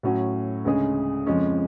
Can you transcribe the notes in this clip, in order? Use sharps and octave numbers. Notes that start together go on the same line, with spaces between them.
A2 F#3 C#4 F#4
D2 C#3 G#3 C#4 G#4
F2 C#3 F3 G#3 C#4